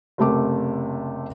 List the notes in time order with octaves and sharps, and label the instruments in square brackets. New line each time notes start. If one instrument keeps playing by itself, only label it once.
[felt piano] F#1 C3 A3 D6